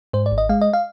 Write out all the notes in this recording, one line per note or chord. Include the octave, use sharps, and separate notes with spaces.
G#2 C5
D5
G#1
D#5
G#3 F5
D#5
F5